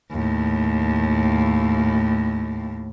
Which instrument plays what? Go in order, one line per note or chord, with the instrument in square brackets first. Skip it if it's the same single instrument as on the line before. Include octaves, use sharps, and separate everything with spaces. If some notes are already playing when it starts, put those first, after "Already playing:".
[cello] D#2 A2